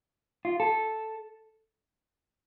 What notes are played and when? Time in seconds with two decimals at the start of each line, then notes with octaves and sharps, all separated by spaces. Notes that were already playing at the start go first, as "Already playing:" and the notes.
0.45 F4
0.60 A4